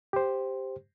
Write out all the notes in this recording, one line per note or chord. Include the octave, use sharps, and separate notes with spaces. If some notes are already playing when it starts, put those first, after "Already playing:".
G4 C5